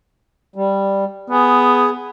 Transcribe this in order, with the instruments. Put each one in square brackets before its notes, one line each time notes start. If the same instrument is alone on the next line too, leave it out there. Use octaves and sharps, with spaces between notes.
[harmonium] G3
[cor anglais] B3 [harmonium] G#4